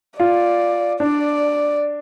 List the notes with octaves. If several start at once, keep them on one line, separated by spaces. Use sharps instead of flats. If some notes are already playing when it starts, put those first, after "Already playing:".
F4 D5
D4 D5